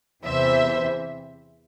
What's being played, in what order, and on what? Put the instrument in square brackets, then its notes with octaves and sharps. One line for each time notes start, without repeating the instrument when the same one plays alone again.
[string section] E2 C3 E3 C5 E5